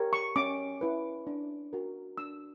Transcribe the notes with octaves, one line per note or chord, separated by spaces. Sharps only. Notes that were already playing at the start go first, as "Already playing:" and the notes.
Already playing: G4 A#4 C#5
C#6
C#4 D6
E4 B4
D4
F#4 A#4
D4 E6